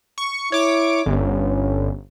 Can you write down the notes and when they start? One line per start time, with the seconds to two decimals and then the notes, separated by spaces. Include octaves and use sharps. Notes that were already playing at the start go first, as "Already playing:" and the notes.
0.18 C#6
0.52 E4 C#5 D6
1.06 G1 C#4